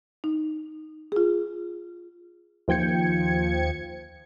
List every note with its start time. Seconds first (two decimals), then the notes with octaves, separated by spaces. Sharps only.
0.24 D#4
1.12 F4 G#4
2.68 D#2 F3 G5 G#6 C#7